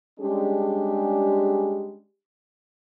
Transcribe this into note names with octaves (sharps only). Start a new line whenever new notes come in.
G3 G#3 C#4 D4 G4 G#4